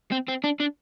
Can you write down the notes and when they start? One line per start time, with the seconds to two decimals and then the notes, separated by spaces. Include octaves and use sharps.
0.12 C4
0.28 C4
0.44 D4
0.60 D4